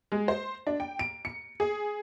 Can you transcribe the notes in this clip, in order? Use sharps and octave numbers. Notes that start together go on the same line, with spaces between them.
G#3
C5
D4
G5
D7
C#7
G#4